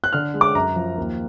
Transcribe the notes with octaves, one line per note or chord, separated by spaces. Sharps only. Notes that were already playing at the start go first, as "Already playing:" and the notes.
F#6
D3 F6
G#3
D6
F#2 A#5
F3
D#2